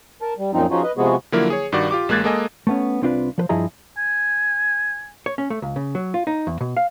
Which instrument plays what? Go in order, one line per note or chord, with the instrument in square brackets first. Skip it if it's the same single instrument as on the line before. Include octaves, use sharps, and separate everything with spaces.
[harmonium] A#4 A5
G3
F#2 A#2 F3 C4 D#4
F3 C#4 D#4 F4 F#4 G#4
B4 D#5
C3 F3 G#3 B3 F#4 G#4
[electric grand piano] D3 F3 F#3 A#3 E4 A#4
G#4 C#5
G2 D#3 F#4 D5
F4 G4 D6
A1 G#3 A#3 F#6 G#6 A6
G#3 A#3 A4 D#5 G#5
[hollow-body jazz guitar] A3 B3 C#4
C2 C4 D4 F4 B4
F3 B4 C5
G2 F3 E4 G#4 D#5 A#5
[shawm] G#5
[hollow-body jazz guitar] C#5
C#4
A3
C#2
C#3
F#3
F4
D#4
E2
B2
F5